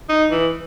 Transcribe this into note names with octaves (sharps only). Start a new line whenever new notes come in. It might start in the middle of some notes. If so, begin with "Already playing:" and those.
D#4
E3